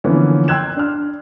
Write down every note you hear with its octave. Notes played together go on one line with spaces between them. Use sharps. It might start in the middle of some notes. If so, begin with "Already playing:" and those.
D3 E3 F3 A#3 B3 C#4
G5 C6 E6 F#6 G#6 E7
D4 F6